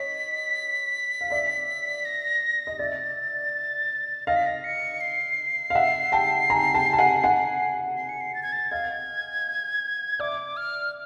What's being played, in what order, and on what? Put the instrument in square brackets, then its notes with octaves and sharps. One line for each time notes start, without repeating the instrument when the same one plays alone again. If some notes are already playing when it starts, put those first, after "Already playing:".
Already playing: [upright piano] C#5 D#5 [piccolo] B6
[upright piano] F5
D5 E5
[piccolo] A#6
[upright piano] D#5
[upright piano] D5 E5 [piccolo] A6
[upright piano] D#5 F5 [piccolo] A#6
[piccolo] B6
A#6
C#7
C7
[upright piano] F5
E5 F#5
G5 A5
G#5 A#5
G5 A5
A5
F#5 G#5
F#5 G#5
[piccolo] C7
C#7
C7
A6
G#6
A6
[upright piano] D#5 F5 [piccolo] G#6
[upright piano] D5 E5 [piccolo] D6
[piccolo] F6